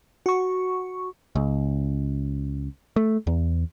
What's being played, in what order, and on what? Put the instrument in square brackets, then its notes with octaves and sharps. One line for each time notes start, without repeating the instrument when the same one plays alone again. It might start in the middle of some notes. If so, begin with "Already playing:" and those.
[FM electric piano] F#4 C#6
[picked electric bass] C#2
A3
E2